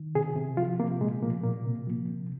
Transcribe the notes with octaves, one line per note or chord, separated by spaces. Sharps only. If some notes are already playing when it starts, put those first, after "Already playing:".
Already playing: D#3
C3 G#4
C3
F3 F4
C3 A#3
A#2 G#3
F3 A#3
A#2 A#3
C3
F3
C3